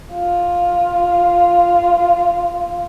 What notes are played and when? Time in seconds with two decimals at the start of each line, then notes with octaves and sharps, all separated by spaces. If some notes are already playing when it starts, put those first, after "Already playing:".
0.13 F4